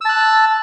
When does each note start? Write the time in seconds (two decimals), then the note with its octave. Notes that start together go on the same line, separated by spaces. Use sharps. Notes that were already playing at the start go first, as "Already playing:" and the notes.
0.01 E6
0.05 A5
0.09 F#6